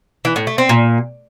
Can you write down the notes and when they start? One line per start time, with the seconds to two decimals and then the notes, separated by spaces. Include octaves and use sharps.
0.25 E3
0.36 A2
0.47 A3
0.58 C4
0.69 A#2